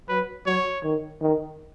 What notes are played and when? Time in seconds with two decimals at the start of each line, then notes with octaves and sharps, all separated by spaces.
0.09 F#3 B4
0.46 F#3 C#5
0.83 D#3
1.21 D#3